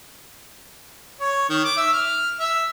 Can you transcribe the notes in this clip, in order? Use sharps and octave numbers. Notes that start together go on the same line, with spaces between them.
C#5
D#3
D6
E5
F6
E5